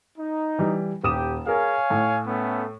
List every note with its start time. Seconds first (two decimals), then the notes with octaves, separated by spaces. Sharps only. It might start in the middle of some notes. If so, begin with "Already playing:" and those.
0.18 D#4
0.59 E3 G3
1.03 D#1 G4 D#6 E7
1.46 G#4 A#4 C#5 F5 G#5
1.90 A2
2.26 A3 B3 C#4